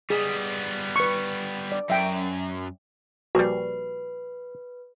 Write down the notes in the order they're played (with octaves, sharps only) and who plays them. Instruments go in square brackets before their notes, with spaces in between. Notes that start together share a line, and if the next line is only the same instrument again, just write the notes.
[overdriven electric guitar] G3 B3 [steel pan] G#4
[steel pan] B4 C#6
D5
[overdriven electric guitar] F#2 [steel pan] E5 G5
[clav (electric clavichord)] A#1 G3 [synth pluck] F#4 [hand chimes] B4